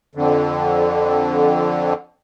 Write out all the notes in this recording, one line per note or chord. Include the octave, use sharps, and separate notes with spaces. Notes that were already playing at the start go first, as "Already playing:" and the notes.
F2 D3